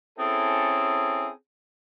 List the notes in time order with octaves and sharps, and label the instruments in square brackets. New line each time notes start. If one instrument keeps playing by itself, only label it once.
[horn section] C4 C#4 E4 G#4 A4